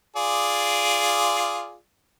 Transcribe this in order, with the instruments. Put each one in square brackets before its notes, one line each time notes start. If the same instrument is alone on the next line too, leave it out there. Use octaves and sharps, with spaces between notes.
[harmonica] F4 G#4 D5